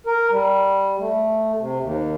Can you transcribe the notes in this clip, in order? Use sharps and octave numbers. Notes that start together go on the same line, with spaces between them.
A#4
G3
A3
C3
D#2